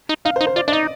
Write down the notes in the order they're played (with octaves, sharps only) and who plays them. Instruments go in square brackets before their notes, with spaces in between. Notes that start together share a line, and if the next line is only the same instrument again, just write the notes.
[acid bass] D#4
[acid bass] D#4 [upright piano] F5
[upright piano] C5
[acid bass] D#4
[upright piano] C5
[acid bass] F4 [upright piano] D5
[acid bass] D4 [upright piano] D5
[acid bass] D#4 [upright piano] D#5